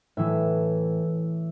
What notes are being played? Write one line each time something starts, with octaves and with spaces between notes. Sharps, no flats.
A2 E3 E5